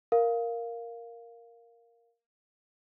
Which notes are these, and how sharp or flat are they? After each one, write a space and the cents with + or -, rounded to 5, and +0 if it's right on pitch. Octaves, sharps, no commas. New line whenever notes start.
A#4 +0 F5 +0